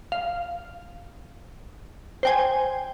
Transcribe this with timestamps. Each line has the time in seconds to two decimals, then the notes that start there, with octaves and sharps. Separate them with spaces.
0.12 F5
2.23 C5 G5 G#5